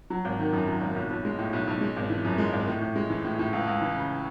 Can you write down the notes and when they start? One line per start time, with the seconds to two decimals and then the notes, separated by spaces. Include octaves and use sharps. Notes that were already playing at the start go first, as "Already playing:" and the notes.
0.10 F#3
0.25 G#1
0.39 D#3
0.53 F#2
0.68 F#3
0.82 G#1
0.96 B1
1.10 B1
1.25 G#3
1.38 A2
1.53 B1
1.67 B1
1.81 G#3
1.96 G#1
2.10 E3
2.25 F#2
2.38 G#3
2.53 G#1
2.67 A2
2.81 A2
2.96 G#3
3.10 E3
3.25 A2
3.39 A2
3.53 C#2
3.68 C#2
3.81 E3
3.96 C#3